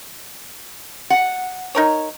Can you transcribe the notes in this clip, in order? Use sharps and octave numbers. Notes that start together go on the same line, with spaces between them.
F#5
D#4 A#4 C#5